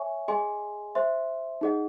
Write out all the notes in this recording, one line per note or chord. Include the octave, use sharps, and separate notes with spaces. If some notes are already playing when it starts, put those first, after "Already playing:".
Already playing: C#5 E5 G#5 C#6
G#4 D#5 G#5 C6
C5 E5 C6
D#4 G#4 D#5 F#5